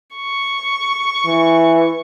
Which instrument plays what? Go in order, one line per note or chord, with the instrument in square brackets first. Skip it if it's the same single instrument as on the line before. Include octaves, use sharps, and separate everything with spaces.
[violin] C#6
[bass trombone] E3